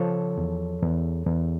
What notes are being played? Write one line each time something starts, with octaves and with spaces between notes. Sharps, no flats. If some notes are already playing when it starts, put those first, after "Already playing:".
Already playing: C#3 F3 A4 C#5
E2
E2
E2